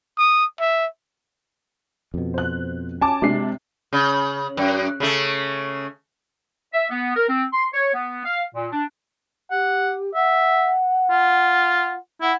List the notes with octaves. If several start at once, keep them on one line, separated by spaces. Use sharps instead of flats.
D#6
E5
F2 B2
C5 F#6
C#4 G#5 A5 D6
C3 G#3 D4 C7
C#3
F#2
C#3 A3
E5
B3
A#4
C4
C6
C#5
B3
F5
A#2
D4
G4 F#5
E5 F#5
F4
E4 F#5